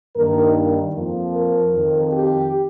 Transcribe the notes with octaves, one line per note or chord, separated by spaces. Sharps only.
G2 D#3 A#3 D#4 A#4
F2 F3 A#3
A#4
F2 D#3 C4
G4